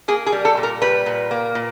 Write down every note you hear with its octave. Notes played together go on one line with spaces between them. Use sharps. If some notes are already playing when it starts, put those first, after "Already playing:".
A#3 G#4
G#4
G3
A4
A#2
A#4
G3 B4
A#2
A#3
A#2